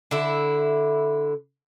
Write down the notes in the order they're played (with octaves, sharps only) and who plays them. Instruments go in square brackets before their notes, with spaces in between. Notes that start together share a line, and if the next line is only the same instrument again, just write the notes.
[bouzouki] D3 E4